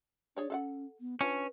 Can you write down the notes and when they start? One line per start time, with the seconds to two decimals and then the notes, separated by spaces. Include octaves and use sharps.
0.37 D4 G#4 C#5 D5
0.50 C#4 A4 F5 F#5
1.00 B3
1.21 C#4 D4 F4 B4